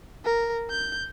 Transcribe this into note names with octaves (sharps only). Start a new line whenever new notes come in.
A#4
G6